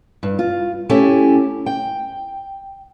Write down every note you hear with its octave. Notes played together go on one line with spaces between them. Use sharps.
G2
F4
A3 C#4 E4 G4 A4 G#5
G5